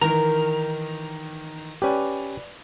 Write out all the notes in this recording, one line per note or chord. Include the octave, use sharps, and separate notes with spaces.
D#3 E3 A#4 A#5
C#4 G4 B4 D5 G#5